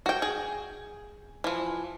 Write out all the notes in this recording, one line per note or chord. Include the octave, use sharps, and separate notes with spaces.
F#4 G5
G#4
E3 F3